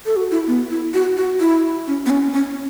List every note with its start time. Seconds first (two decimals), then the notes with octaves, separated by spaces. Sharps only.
0.06 A4
0.16 F#4
0.31 E4
0.47 B3
0.71 E4
0.94 F#4
1.17 F#4
1.40 E4
1.87 C#4
2.06 B3
2.10 C#4
2.34 C#4